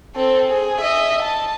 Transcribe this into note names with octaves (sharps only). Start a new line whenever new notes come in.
C4 A4
G#4
D#5 E5
A5